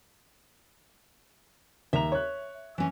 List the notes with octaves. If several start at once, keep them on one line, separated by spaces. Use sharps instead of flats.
D#2 E5 A#5 F7
C#5 F#6
E3 C#4